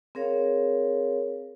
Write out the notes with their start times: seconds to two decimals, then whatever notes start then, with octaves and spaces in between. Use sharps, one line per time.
0.15 C4 G#4 A#4 C#5 F5